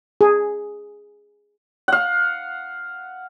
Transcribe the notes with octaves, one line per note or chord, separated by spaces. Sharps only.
G#4
F5 F#5